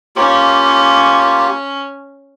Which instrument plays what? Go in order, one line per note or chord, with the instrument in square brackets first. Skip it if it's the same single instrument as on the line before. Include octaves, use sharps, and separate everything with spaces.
[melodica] A#3 F4 G4 [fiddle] C#4